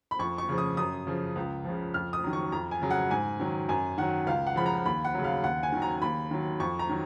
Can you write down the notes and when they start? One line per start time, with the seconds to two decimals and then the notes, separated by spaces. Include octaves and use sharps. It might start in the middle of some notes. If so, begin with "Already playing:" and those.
0.11 B5
0.19 F2 C#6
0.38 C#6
0.49 C#3 F3
0.58 D#6
0.77 F#2 D#6
1.07 C#3 F3
1.36 C#2
1.65 C#3 F3
1.94 F2 F6
2.13 D#6
2.24 D#3 F#3
2.33 C#6
2.52 F2 A#5
2.71 G#5
2.82 C#3 F#3
2.91 F#5
3.10 G#2 G#5
3.40 D#3 F#3
3.69 F#2 G#5
3.98 D#3 F#3 F#5
4.27 C#2 F5
4.47 F#5
4.56 C#3 F3 B5
4.66 A#5
4.85 D#2 B5
5.05 F#5
5.14 C#3 F#3
5.24 F5
5.43 D#2 F#5
5.63 G#5
5.73 D#3 F#3
5.82 A#5
6.02 D#2 B5
6.31 D#3 F#3
6.60 F2 C#6
6.79 A#5
6.89 D#3 F#3